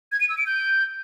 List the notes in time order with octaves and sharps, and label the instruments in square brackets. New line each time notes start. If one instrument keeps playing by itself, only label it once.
[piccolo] G#6
D#7
E6
D7
G6